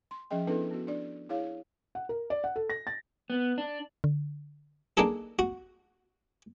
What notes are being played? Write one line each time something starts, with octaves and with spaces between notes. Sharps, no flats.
C6
F3 C#4 G#4 D#5 G5
B3 C#4 D4 E4 A4 B4
B3 F#4
D4 D5
E4 G#4 C#5 F5
F#5
A#4
D5
F#5
A4
A#6
A6
B3
D4
D3
A#3 D4 D#4 G#4 A4
F#4